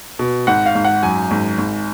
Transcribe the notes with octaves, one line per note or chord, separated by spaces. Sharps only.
B2
G#1 F#5
F5
G#1
F#5
F#2 G#5
G#1
G#1